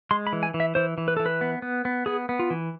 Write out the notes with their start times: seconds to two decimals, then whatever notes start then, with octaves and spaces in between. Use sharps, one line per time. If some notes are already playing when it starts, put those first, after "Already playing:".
0.11 G#3 C6
0.27 B5
0.33 E3
0.43 G#5
0.54 E3
0.60 E5
0.75 E3 C5
0.98 E3
1.08 B4
1.17 E3 A4
1.26 B4
1.41 B3
1.62 B3
1.85 B3
2.06 B3 G#4
2.29 B3
2.39 F4
2.50 E3